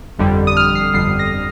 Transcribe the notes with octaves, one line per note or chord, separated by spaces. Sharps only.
G1 F2 D3 G3
D#6
F6
C7
G1 F2 D3 G3 C7
A#6